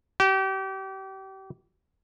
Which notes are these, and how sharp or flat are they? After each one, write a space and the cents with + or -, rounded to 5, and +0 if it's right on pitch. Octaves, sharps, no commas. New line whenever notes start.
G4 -30